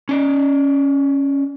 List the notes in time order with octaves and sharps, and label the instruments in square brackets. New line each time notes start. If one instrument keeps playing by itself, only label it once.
[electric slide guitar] C#4 D5 D#5